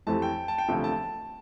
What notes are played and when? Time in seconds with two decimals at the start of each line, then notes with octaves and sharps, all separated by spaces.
0.07 F2 E3 A3 C4 G4 A5
0.22 G5
0.48 A5
0.58 G5
0.68 E1 D2 C3 F3 A3
0.84 A5